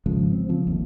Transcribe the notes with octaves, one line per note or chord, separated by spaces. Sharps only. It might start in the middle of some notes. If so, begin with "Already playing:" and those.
G#1 C#3 F3 G#3
C4
C#3 F3 C4
G1 D#2